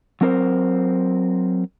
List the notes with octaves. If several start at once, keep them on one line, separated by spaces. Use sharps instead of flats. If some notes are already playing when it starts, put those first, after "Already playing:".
F#3 C4 A#4 C5